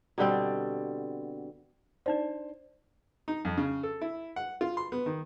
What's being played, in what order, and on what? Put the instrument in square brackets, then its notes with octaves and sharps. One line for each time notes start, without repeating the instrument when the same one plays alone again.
[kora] B2 D3 G3 C4
[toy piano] D4 D#4 D5 [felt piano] C5
[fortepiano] D#4
F2
C#3
A4
E4
F#5
F4
C6
B3
D#3